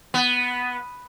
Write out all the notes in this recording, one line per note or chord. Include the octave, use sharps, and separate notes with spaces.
B3